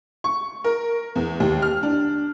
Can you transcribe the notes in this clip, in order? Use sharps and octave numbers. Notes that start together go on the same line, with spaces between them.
C#6
A#4
E2
D#2
F6
D4